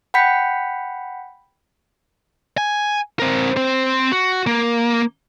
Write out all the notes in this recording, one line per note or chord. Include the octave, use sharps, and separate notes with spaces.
F#5 G5 B5 G6 B6 C#7
G#5
C4 A#4
C4 C5
F#4
A#3